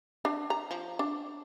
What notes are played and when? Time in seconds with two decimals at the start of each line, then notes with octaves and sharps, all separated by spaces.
0.25 D4
0.50 A#5
0.71 F3
0.99 D4